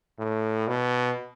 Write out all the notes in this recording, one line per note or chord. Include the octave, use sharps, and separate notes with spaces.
A2
B2